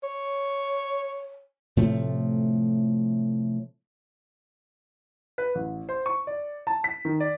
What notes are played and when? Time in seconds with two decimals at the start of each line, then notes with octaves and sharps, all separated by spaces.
0.04 C#5
1.77 A2 C3 F3 A3
5.38 B4
5.55 A1
5.89 C5
6.06 C#6
6.27 D5
6.67 A5
6.84 B6
7.05 D#3
7.20 D5